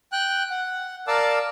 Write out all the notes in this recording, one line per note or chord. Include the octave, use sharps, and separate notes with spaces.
G5 F#6
F#5
A#4 D5 F5 A5 D6 E6